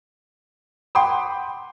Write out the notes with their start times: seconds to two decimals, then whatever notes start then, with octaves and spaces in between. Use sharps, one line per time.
0.95 F#5 G5 B5 C6 D6 D#6